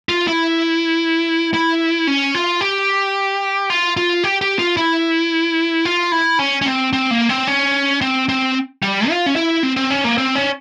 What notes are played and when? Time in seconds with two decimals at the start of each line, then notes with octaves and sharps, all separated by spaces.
0.09 F4
0.28 E4
1.54 E4
2.07 C#4
2.35 F4
2.61 G4
3.70 F4
3.97 F4
4.24 G4
4.41 G4
4.59 F4
4.77 E4
5.85 F4
6.12 E4
6.39 C#4
6.62 C#4
6.66 C4
6.93 C4
7.11 A#3
7.29 C4
7.47 C#4
8.01 C4
8.29 C4
8.82 G3
9.09 F4
9.26 C#4
9.36 E4
9.63 C4
9.76 C4
9.91 C#4
10.04 A#3
10.18 C4
10.35 C#4